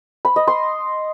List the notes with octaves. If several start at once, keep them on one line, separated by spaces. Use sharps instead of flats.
B5
D#5
C6